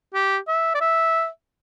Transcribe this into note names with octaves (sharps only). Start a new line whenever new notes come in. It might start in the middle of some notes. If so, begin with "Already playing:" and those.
G4
E5
D5
E5